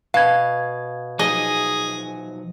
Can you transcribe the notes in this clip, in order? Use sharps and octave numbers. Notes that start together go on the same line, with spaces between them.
B2 F5 G#6
F3 F#3 D#4 G#4 D#5